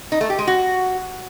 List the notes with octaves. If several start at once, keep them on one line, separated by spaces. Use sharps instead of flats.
D#4
A3
G4
G#3
F#4